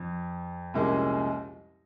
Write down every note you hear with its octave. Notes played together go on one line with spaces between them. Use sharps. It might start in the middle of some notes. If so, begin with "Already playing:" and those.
Already playing: F2
C2 A#2 G#3 C#4